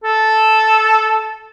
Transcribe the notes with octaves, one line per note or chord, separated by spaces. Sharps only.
A4